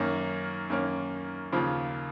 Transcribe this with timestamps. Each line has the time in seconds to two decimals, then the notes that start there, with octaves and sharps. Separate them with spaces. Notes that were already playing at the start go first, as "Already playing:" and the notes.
Already playing: F#2 D#3 A#3 C#4
0.70 F#2 D#3 A#3 C#4
1.52 D#2 C#3 F3 A#3 F4